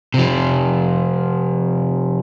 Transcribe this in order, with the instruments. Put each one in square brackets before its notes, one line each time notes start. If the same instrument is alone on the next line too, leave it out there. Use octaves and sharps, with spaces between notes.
[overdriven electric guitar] C3 F3